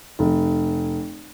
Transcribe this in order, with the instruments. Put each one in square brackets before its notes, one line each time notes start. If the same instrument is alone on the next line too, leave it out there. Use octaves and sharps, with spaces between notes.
[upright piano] F1